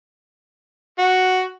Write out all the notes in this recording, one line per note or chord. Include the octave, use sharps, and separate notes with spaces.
F#4